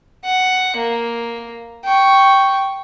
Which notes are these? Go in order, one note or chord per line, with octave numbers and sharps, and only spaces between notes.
F#5
A#3
G5 C#6